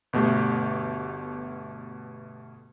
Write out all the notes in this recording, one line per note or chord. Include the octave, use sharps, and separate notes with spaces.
G1 B2 A3 G4